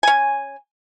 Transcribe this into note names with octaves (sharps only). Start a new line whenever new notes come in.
C#4 G#5